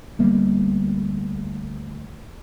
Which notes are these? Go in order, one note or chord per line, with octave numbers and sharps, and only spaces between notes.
D2 G3 A#3 B3